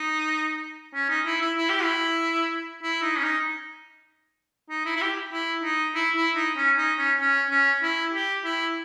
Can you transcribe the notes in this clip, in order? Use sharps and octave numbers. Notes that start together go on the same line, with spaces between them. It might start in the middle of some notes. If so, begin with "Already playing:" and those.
Already playing: D#4
C#4
D#4
E4
E4
E4
G4
E4
E4
D#4
C#4
D#4
D#4
E4
E4
G4
E4
D#4
E4
E4
D#4
C#4
D#4
C#4
C#4
C#4
E4
G4
E4